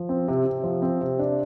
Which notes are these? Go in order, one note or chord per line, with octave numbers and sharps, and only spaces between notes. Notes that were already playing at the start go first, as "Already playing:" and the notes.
Already playing: F3
C4
C3
C3
F3
C4
C3
D4